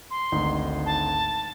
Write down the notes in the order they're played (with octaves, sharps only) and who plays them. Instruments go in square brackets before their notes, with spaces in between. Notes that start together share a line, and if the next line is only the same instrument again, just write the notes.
[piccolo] C6
[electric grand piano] G#1 D2 D#4
[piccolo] A5